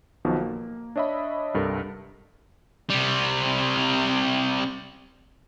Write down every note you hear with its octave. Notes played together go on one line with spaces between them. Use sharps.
B1 B2 D#3 F3
A#3
D4 C#5 D#5 E5 B5
C2 G2 A4 A#4
C3 G3